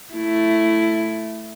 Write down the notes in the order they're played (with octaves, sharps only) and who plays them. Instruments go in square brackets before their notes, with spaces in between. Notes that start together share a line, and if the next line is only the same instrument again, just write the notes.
[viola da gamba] A3 E4